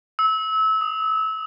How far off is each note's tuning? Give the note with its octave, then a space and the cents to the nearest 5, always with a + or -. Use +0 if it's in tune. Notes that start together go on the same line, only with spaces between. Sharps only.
E6 -25
D#6 +0